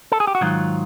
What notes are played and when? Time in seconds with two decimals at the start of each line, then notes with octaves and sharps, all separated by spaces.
0.12 A4
0.20 G#4
0.27 G4
0.35 F#4
0.41 G#2 D#3 F#3 F4